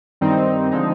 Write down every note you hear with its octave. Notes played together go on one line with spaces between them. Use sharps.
G2 D#3 G3 C4 D#4
D3 F3 G#3 C4 D#4